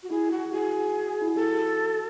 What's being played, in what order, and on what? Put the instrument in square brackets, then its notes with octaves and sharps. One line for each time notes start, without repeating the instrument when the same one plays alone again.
[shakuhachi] F#4
[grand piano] E4 [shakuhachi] G#4
[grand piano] E4 [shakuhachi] F#4
[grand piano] F#4 [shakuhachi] G#4
[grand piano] E4
F#4
[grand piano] G#4 [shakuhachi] A4